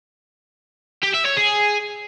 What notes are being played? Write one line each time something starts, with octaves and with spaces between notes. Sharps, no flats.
G4
E5
C#5
G#4